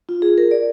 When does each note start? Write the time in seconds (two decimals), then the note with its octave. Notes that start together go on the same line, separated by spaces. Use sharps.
0.09 F4
0.22 G#4
0.38 A#4
0.51 D5